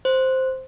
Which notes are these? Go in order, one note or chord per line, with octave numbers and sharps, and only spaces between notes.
C5